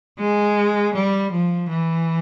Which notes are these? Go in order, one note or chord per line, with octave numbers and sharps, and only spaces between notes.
G#3
G3
F3
E3